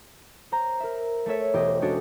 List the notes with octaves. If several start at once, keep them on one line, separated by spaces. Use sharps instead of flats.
C5 A#5
A#4 E5
A3 A4 C#5 E5
E1 G4 C5 D#5
G#3 C#4 D4 F#4 G4 A4